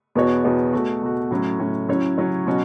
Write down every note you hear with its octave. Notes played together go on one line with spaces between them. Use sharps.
E2 B2 B3 F#4 C#5
E2 B2 B3 F#4 C#5
B2 A3 F#4
B2 A3 F#4
A2 F#3 C#4
A2 F#3 C#4
F#3 C#4 E4 C#5
F#3 C#4 E4 C#5
B2 F#3 C#4 F#4